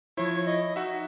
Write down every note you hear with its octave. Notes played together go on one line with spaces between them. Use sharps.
F3 E4 C#5
D#5
D#4 F#4 E5